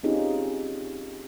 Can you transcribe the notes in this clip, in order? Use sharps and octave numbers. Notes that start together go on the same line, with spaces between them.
C4 C#4 D#4 F4 G4 G#4